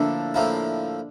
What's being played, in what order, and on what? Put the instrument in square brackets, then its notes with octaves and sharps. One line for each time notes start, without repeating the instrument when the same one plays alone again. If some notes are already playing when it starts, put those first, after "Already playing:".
Already playing: [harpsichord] A2 F3 A#3 E4 [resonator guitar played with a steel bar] D3 D4
[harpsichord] A2 F3 A#3 E4